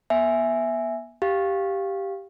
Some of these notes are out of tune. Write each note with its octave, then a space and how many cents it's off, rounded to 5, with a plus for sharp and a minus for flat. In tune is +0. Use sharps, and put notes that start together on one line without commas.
B3 -35 E5 +0 G#5 +0
G4 +0 F5 +0